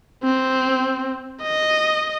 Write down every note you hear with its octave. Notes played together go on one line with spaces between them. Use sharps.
C4
D#5